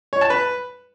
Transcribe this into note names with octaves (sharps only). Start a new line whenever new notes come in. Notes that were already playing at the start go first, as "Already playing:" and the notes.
C#5
A5
B4